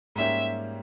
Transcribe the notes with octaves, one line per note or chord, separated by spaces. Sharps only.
G#2 G3 A#3 C#4 G4 E5